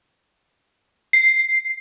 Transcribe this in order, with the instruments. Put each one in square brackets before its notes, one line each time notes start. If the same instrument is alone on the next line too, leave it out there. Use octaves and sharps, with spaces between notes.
[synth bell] C7